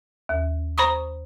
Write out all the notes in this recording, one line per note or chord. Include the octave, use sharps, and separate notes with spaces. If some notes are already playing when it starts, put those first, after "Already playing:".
D#2
C5 A#5 B5 C#6 D#6